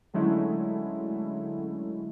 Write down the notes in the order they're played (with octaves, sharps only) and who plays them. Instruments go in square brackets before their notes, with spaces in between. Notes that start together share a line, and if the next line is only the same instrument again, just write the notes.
[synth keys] D3 F#3 G#3 A3 C#4 E4